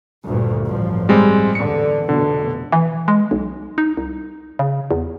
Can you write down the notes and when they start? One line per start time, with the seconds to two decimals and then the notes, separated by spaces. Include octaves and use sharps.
0.25 D2 G2 A#2
0.67 A1 G2 F3
1.09 G3 G#3 C4
1.55 E2 D3 C#7
2.09 F1 B2 D3
2.72 E3
3.08 G#3
3.31 B1
3.78 D#4
3.97 C2
4.59 C#3
4.91 E2